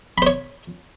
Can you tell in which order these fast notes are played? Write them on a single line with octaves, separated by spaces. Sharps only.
B5 C5 C#5